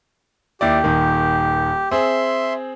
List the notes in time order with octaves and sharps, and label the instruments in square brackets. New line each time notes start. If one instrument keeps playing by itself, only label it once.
[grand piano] D#2 E4 D5 [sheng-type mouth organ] G4
[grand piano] D#1 D#3
[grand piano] C4 G#4 [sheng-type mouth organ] E5 C6